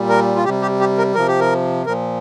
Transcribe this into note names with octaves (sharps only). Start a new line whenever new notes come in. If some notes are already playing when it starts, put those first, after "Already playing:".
Already playing: A#2 G3
A#4
F4
C3 G3 G4
G4
G4
A#4
C3 F3 A#4
G4
A#4
A#2 F3 A#4